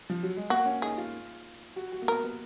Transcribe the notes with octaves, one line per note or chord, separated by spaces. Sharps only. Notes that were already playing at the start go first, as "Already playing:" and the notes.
F3
F#3
G#3
A#3 F#4
C#4
D#4 G#4
F4
F#4
F#4
A#3
B3 A#4
B3